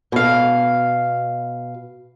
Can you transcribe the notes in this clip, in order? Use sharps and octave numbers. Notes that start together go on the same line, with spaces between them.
B2 F5